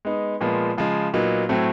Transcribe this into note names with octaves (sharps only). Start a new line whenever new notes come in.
G#3 B3 D#4
A#2 F3 G#3 B3
C#3 F3 G#3
A#2 F#3 B3 D#4
A2 F#3 A3 C4